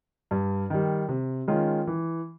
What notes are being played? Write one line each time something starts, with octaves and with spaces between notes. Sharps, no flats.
G2
D#3 G3
C3
D#3 G#3 C#4 F4
E3